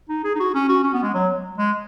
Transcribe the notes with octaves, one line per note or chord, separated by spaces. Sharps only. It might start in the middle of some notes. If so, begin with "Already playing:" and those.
D#4
G#4
D#4
F#4
C#4
F#4
C#4
B3
G#3
F#3
G#3